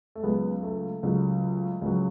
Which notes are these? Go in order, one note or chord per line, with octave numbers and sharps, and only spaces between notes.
A3
C#2 C#3 F#3 G#3 B3
A3
C#2 C#3 F#3
C#2 C#3 F#3